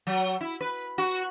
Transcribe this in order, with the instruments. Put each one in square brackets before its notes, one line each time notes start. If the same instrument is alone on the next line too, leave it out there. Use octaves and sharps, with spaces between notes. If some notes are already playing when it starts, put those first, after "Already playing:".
[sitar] F#3
E4
B4
F#4